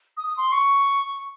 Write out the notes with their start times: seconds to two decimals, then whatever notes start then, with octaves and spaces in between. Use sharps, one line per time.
0.17 D#6
0.27 D#6
0.37 C6
0.52 C#6